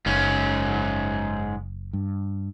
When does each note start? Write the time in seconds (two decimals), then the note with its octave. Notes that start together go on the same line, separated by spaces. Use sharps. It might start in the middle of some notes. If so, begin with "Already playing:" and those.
0.06 F#1 G#2 C#4
1.93 G2